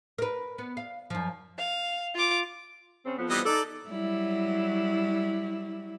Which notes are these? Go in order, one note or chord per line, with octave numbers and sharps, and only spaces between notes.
A#4 B4
B3
F5
F#2 F3
F5
F4 D6
C#3 C4
F2 F3 B3
E3 G3 D#5
D#4 A4 D5
F#3 G3 E4